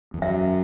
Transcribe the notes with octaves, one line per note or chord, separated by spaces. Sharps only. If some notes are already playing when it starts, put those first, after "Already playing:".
E2
F#2 E5